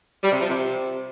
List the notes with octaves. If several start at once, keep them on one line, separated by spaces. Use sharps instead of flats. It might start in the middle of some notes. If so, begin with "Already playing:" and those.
G3
C3
F3
C3